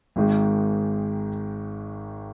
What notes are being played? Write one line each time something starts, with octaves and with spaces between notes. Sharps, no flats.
G#1 G#2 D#3 G#3